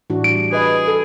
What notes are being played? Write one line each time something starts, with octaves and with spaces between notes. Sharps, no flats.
A2 E3 D4 F#4
G3 D7
G#4 B4 D#5 B5
A4